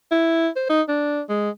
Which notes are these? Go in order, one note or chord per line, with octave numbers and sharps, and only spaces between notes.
E4
C5
D#4
D4
G#3